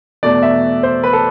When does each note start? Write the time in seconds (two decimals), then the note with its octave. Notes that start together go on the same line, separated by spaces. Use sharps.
0.23 E2 B2 A3 D5
0.43 E5
0.83 C5
1.04 B4
1.13 A4